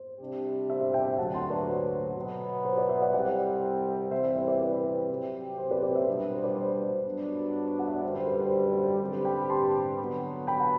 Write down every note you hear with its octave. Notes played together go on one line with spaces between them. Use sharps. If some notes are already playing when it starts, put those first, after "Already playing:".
Already playing: C5
C3 G3 D4 G4
C5 E5
C5 E5
E5 G5
E5 G5
D2 D3 F#3 F#5 A5
A5 C6
B4 D5
C5
B2 F#3 B3
C5
B4 D5
C5 E5
D5 F#5
C2 C3 G3 C4 D5 F#5
C3 E3 G3 C4 E4 C5 E5
C5 E5
C5 E5
B4 D5
B4
C3 F#3 C4 G4
C5
B4 D5
B4 D5
C5 E5
B2 G3 B3 D4
C5
B4 D5
C5
G2 F#3 B3 D4
F#5
E5
D5
F#2 D3 G3 C5
C5
B4
C5
C5
C5
D3 G3 C4 G4 B4
C5
G5 B5
A5 C6
D3 F#3 B3
G5 B5
F#5 A5